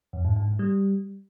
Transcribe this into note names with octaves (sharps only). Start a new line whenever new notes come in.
F2
G#2
G#2
G#2
G3